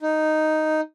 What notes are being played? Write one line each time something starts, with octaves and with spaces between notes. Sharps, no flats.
D#4